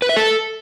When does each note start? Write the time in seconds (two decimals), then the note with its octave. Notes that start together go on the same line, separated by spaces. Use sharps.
0.02 B4
0.09 E5
0.16 A4